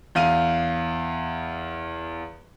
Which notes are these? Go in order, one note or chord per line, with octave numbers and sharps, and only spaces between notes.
E2 F5 D#7